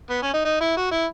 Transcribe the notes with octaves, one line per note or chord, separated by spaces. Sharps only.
B3
C#4
D#4
D#4
E4
F#4
E4